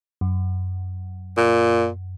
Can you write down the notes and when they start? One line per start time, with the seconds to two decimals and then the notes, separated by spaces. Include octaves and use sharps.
0.21 F#2
1.37 A#2